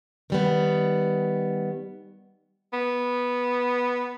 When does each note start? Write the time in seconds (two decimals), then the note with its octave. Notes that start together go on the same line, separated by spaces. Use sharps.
0.30 D#3 G3 B3
2.73 B3